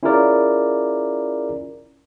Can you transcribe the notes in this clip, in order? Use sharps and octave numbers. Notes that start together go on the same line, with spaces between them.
C#4 E4 F4 G#4 A#4 D5